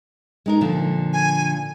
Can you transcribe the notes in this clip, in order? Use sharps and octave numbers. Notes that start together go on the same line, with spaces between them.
G#3 D#4 A#4
A#2 D3 F3
G#5